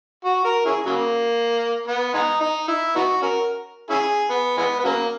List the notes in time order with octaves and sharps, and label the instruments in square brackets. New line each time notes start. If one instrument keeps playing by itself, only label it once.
[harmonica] F#4
A#4
C#4 E4 G#4
C#3 F#3 A#3
B3
G#3 B3 D#4
D#4
E4
B3 D#4 F#4
C#4 F#4 A#4
C#4 E4 G#4
B3
E3 G#3 B3
B3
C#3 F#3 A#3